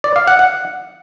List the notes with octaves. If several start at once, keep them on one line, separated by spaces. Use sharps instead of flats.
D5
F5
F#5
F#5